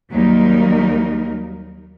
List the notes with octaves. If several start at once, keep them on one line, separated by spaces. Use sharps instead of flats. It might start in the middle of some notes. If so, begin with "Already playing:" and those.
D#2 F#3 G3 A#3 D#4 A#4